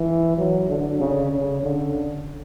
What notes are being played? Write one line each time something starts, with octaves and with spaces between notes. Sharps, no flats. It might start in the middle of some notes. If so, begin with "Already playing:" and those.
Already playing: E3
F#3
D3
C#3
C#3
D3